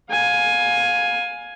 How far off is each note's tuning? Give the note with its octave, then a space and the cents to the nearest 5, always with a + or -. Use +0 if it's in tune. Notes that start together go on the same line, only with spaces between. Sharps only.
F5 +25 G#5 +5